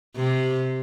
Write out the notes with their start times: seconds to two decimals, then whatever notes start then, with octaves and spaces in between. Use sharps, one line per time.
0.16 C3